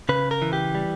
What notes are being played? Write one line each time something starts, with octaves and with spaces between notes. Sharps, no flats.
C#3 B4
A#4
E3
G4
G3